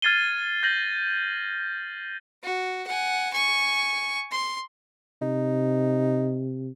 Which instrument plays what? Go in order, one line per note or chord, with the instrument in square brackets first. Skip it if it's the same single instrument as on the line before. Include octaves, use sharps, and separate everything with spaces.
[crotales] F6 G#6 A6 C7 D#7 G7
G6 A6 A#6 F#7
[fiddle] F#4
F#5 G#5
G#5 C#6
C6
[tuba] C3 [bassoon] D#4